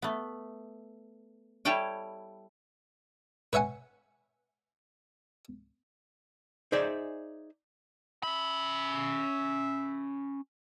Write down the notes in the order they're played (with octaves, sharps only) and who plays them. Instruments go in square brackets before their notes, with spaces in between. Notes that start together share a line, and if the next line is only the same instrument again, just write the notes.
[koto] A3 B3
G3 E4 A4 C#5 G5 G#5
[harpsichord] B4 C#5 E5 F#5 G#5
[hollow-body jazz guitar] D#4 G#4 C5 D5 E5 G#5
[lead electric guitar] C#4 B5 [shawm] E5